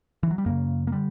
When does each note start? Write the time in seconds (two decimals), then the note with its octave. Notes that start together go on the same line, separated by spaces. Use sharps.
0.23 E3
0.31 F#3
0.38 G3
0.46 F#2 C#3 A#3
0.87 A#3
0.92 D3 G3